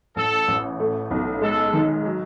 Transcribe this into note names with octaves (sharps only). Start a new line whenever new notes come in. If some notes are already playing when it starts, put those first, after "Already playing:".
A1 A4
A1
A3
B1
G#3 A4
D#3
F#3